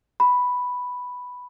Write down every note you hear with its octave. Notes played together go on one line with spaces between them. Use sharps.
B5